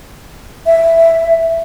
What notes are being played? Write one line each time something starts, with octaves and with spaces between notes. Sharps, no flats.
E5